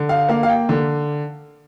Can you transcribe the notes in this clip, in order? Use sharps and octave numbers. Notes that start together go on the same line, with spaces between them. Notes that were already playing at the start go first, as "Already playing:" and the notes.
Already playing: D3
F5
A#3 F5
F5
G5
D3